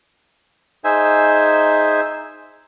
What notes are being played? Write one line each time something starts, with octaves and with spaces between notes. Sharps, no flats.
D#4 G#4 C5 E5 G#5